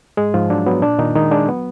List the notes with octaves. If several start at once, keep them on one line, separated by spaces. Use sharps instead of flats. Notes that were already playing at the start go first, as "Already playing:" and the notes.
G#2 G#3 G#4
G#2 F3 F4
F#3 D4
F#3 B3
A#2 D4
A#2 D#3 D#4
D#3 G#3 D#4
G#3 D4
F#3 B3